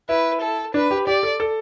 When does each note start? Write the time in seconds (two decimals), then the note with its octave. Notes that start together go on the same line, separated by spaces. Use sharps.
0.09 E4 B4
0.42 A4
0.74 D4 B4
0.91 G4
1.07 G4 D5
1.23 A4
1.40 A4